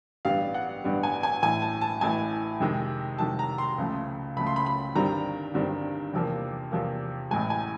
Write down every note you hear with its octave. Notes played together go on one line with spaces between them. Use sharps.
A1 G2 D3 G3 B3 F5
F#5
A1 G2 D3 G3 B3
G#5
G#5
A1 A2 E3 G#5
A5
A5
A1 A2 E3 G#5
F2 C3 D#3 G#3
F2 C3 D#3 G#3 A5
A#5
C6
C#2 C#3 F3 A3
C#2 C#3 F3 A3 B5
C6
B5
B5
G1 G2 D#3 G3 C4 A#5
G1 G2 D#3 G3 C4
E2 C3 F3 A#3
E2 C3 F3 A#3
A1 A2 E3 G#3 G#5
G#5